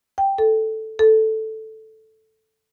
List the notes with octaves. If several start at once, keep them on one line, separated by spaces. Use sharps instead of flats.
G5
A4
A4